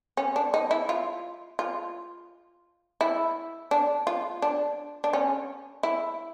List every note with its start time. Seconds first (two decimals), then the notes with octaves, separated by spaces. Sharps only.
0.17 C#4
0.36 D4
0.54 D#4
0.71 E4
0.89 F4
1.59 F4
3.01 E4
3.71 D4
4.07 F4
4.42 D4
5.04 D4
5.13 C#4
5.83 E4